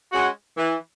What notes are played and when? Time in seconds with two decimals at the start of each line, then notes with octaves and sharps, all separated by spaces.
0.11 G#3 C#4 F#4
0.58 E3